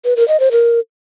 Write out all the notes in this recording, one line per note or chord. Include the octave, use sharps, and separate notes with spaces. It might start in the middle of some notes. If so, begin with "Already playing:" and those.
B4
A#4
D#5
C5
A#4